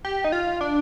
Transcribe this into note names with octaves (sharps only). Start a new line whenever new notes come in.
G4
D#4
F4
D4